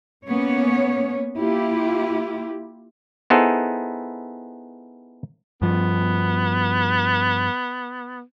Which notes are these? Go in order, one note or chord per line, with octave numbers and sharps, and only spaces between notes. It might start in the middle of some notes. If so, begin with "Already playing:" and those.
A#3 B3 C#4 C#5
A#3 E4 F4 G4
B3 D#4 E4 G#4 A4 C5
G2 F3 B3